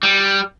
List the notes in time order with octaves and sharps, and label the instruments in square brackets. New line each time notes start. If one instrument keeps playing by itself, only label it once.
[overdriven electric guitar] G3